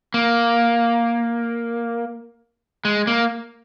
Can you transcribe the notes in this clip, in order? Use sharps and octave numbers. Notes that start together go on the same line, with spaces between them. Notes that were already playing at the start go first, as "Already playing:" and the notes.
A#3
G#3
A#3